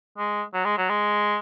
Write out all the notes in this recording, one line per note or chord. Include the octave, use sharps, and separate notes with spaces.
G#3
F#3
G#3
F#3
G#3